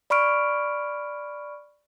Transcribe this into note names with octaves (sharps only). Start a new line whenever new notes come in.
D5 B5 C#6 F6 D7